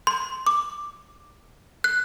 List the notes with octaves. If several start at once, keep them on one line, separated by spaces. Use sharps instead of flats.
C6
D6
F#6